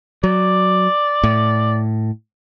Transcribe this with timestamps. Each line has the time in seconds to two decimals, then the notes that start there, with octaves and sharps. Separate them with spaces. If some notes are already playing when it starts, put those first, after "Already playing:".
0.24 F#3 D5
1.23 A2